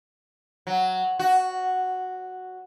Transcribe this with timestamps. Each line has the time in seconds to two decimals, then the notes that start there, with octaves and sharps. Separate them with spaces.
0.67 F#3
1.19 F#4